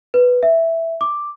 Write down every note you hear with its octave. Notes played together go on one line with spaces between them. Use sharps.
B4
E5
D6